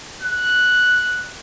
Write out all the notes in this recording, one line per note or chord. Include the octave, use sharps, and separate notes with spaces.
F#6